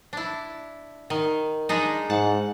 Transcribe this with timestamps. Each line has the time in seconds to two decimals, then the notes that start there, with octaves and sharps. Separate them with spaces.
0.13 D4 E4
1.10 D#3
1.69 G#3 D4 D#4
2.10 G#2 F#5 A5